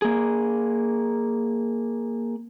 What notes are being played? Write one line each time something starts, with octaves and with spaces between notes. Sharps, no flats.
A#3 G#4